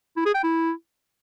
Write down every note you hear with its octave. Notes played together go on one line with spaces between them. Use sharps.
E4
G#4
G5
E4